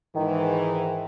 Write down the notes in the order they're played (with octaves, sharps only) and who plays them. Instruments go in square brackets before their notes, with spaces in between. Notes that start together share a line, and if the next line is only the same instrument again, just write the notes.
[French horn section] G#2 E3 [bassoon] D#3